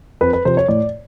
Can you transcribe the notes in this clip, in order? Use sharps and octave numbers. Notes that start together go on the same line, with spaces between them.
F2 B4
B4
C3 F3 C5
C#5
A2 D5